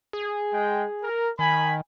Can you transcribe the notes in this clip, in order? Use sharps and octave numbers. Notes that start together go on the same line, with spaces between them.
G#4
G#3 G5
A#4
D#3 G#5 B5